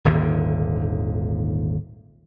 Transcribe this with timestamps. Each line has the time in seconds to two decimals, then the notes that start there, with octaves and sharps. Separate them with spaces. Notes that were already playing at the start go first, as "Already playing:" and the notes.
0.05 D#1 G#1 D#2 D3